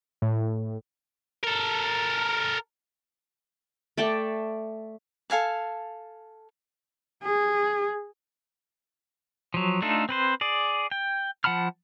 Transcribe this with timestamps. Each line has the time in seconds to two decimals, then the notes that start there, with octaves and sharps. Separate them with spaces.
0.22 A2
1.43 A4 A#4
3.97 A3 D5 G5 A5
5.30 A4 F5 G#5 A5
7.23 G#4
9.54 F3 F#3
9.82 A3 D4 D#4 F4 A4
10.09 C4 B4 C5
10.41 G#4 D5
10.91 G5
11.44 F3 F#5 A5 B5 F6